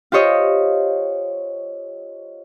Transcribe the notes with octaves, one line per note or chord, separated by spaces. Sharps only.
F4 G4 C5 C#5 D#5